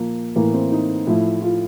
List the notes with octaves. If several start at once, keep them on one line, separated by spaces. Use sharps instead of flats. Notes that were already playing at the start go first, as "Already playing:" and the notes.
Already playing: A#2 F3 A#3
A2 E3 A#3
C4
D#4
A2 F3 E4
F4